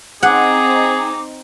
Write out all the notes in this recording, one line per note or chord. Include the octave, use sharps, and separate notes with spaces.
C4 D#4 G#4 F#5 D6